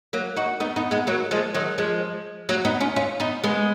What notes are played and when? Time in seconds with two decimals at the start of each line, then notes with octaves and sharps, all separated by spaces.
0.13 F#3 A#3
0.36 D#4 F#4
0.60 B3 D#4
0.76 B3 D#4
0.91 G#3 B3
1.07 F#3 A#3
1.31 F3 G#3
1.55 D#3 F#3
1.78 F3 G#3
2.49 F#3 A#3
2.65 B3 D#4
2.81 C#4 F4
2.96 C#4 F4
3.20 B3 D#4
3.44 G#3 B3